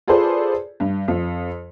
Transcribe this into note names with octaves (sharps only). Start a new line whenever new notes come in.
F4 G#4 A4 B4 C5 D5
G2
F2